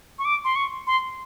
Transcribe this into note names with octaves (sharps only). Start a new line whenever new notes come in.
C#6
D6
C6
C#6
C6